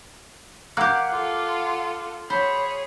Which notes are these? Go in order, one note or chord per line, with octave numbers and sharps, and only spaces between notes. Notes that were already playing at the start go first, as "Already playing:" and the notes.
A#3 G4 F5 F#5 D6
F4 A4
G#4 C5 C#5 B5